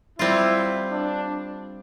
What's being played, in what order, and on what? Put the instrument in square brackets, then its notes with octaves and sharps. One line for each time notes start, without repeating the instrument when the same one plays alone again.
[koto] G3 C4 F4 [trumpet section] E4
[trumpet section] D4